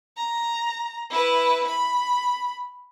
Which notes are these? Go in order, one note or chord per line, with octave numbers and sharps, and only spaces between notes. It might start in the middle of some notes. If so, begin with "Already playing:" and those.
A#5
E4 B4
B5